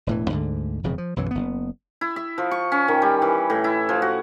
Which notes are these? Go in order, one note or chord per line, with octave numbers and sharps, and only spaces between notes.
E1 A2 E3
D2 G#2 D3
E1 F2 C#3
F3
B1 F#2 E3 F#3
F#1 B3
E4
E5
F3
C#6
C#4
D#3
G3
E3
A2
E4
F3
F#4